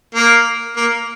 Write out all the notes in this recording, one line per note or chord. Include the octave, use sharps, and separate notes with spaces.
A#3
A#3